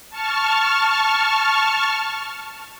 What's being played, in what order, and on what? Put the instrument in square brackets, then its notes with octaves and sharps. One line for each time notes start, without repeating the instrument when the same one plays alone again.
[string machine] A5 C#6 F6